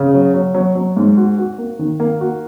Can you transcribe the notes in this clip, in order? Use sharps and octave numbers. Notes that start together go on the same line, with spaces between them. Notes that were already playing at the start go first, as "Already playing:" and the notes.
Already playing: C#3
F#3
F#3
F#3
F#3
G#2
F#4
F#4
A#3
D#3
A#3
F#4